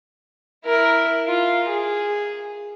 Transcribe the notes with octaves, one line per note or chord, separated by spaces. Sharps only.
E4 A#4
F4
G#4